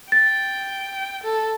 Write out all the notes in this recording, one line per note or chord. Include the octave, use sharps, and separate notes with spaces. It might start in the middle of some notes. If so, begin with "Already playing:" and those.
G5 A6
A4